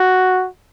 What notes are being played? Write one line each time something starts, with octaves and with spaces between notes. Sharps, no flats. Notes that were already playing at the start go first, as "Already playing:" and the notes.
Already playing: F#4